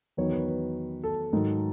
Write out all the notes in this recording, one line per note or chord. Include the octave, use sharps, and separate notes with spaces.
E2 D#3 F#3 B3 C#5
B4
B4
A4
G#2 D#3 F#3